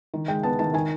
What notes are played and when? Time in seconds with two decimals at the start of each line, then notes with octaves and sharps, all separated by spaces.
0.14 D#3
0.28 G#3 G5
0.43 B3 A5
0.59 D#3 A5
0.74 D#3 G#5